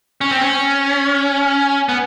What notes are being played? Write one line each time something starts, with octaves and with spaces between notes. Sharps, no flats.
C#4
C4
C#4
B3